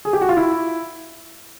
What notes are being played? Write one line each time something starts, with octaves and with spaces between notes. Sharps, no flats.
G#4
G4
F#4
F4
E4